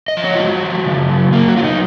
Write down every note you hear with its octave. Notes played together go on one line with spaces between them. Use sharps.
D#5
F3
C#5
F4
G#3 F#4
F3
C#3
F#3
F#3 A#3
F#4
F#3 F4
D#4